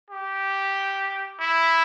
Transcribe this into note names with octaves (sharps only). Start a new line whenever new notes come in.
G4
E4